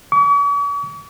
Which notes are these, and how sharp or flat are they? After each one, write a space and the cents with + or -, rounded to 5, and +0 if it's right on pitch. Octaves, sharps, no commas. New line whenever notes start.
C#6 +45